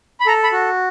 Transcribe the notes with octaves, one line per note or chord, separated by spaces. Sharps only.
B5
A4 A#5
B5
F#4